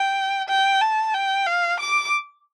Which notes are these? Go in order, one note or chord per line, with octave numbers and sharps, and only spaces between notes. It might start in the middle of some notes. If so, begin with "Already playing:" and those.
Already playing: G5
G5
A5
G5
F5
D6